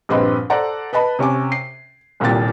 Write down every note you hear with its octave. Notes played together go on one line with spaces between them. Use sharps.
A#1 G2 C4 B4 D#5 B5
A4 C5 D5 F#5 A#5
B4 D#5 A5 B5
C3 C#4 G#5 D6
C7
D#1 C2 A#2 G3 G5 A6